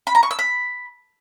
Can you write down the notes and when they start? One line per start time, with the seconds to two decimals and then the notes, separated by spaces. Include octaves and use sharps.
0.07 B5
0.15 A#5
0.23 C#6
0.31 E6
0.39 B5